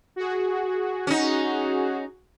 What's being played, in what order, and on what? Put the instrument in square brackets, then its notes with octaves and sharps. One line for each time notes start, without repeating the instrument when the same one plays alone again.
[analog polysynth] F#4 G#4
[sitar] C#4 D#4